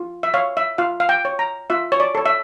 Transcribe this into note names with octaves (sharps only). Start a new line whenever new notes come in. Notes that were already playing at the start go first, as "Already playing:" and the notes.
Already playing: F4
E5
C#5 F5
E5
F4 F5
F5
G5
C#5
A#5
F4 E5
C#5
D5
A4 C#5
E5